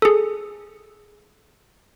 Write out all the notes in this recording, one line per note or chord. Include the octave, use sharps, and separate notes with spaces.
G#4 A4